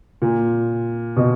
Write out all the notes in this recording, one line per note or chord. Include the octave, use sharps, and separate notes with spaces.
A#2
B2